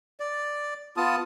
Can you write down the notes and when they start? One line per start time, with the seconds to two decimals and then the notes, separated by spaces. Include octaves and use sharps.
0.20 D5
0.97 B3 F4 A5 D#6